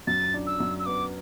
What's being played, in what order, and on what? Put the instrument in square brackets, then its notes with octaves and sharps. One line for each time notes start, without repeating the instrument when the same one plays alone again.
[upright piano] F#2 [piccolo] A6
[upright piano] D4
[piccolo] E6
[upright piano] F#2
[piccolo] E6
[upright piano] B3 [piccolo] D6